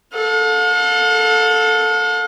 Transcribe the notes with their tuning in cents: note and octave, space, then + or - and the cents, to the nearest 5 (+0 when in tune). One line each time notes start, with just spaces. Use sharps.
A4 +0 F5 +45